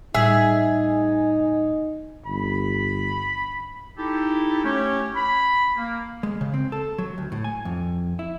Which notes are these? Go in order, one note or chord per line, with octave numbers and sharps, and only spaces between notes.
A2 G3 D#4 G#4 E5
G1 B5
D#4 E4 G4 A4
A3 C#4 G4 C#5
B5
A#3
G#3
C#3
C4
A4
F#3
D2
A2
G#5
F2
E4